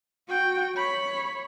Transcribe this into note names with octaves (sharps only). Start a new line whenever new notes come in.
F#4 G5
C#5 B5